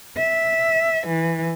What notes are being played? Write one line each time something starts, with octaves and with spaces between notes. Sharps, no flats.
E5
E3